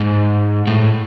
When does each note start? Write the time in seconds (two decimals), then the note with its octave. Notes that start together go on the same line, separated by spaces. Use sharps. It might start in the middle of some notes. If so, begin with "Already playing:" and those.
Already playing: G#2
0.67 A2